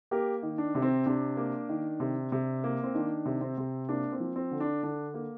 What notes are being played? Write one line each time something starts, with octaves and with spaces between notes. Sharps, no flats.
A#3 G4 A#4
D#3
D4
C3
C4
C3 D4
A#3
D#3
C3
C3
A#3
C4
D#3 D4
C3
C4
C3
A#3 D4
C4
F3
C4
D3
D4
D3 D4
A#3